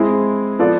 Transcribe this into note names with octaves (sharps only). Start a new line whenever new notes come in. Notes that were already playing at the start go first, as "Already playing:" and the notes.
Already playing: G#3 C4 E4 G#4
F3 B3 F4 A4 D5